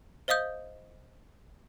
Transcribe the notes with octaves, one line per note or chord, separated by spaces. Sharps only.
C5 D#5 F5 D#6 G6